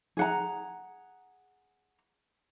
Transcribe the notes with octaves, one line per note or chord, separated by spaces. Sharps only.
G#4 F#5 A#5